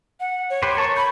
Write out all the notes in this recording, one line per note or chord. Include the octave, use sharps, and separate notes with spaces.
F#5
C#5
G4 B4 C5
A#4 A5 C#6
C#5 B5 G6